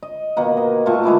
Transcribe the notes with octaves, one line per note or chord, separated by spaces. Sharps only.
D#5
B2 D#3 A#3 F#5
D#5
A#2 A3 F4 C#6
D3 G#3 E4 D6